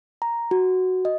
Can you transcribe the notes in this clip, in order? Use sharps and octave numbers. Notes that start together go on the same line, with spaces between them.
A#5
F#4
D#5